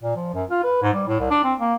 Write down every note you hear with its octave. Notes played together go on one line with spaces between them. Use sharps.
A#2
F3
F#2
F4
B4
G#2
G3
A2
C2
D4
C4
A#3